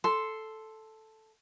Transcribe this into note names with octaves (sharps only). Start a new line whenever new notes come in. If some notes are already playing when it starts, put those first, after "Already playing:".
A4 C6